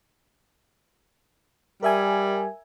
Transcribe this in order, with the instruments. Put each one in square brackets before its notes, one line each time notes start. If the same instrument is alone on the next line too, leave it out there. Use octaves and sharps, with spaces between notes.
[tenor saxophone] G3 [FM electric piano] A#4 E5 G#5